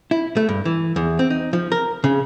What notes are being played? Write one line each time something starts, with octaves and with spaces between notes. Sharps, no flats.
E4
A3
G2
E3
E2
C4
D#4
F3
A#4
C#3